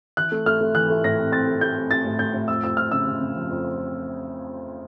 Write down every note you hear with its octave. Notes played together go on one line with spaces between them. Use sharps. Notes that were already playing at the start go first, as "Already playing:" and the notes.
E3 F#6
A3
A3 F6
A3
E3 F#6
A3
A2 A#6
C4
C4 A6
A3
A3 G6
C4
C4 A6
A2
A2 G6
A2
F2 E6
F2 E6
F2 F6
C#3 E6
C#3
C#3
F3
F2